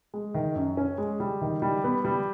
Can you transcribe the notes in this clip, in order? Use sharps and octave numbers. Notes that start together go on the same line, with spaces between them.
G#3
D#3
F#2
C#4
G#3
G3
D#3
G3
B3
G3